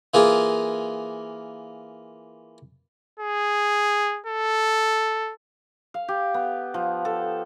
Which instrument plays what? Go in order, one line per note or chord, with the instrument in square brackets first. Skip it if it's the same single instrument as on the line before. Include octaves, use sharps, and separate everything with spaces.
[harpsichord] E3 A#3 F4 G#4
[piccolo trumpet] G#4
A4
[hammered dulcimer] F5
G4
B3
F3
A4